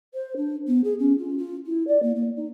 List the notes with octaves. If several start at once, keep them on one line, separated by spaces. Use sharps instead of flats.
C5
D4
B3
G#4
C#4
F4
F4
E4
D5
A#3
A#3
D#4